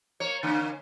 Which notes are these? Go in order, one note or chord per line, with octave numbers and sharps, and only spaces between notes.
A#3 C#5
D3 A#3 C#4